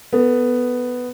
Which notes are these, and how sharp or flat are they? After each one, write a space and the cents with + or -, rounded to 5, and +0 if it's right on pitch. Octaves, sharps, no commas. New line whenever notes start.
B3 +5 A4 +25